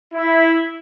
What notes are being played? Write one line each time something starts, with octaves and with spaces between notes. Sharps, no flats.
E4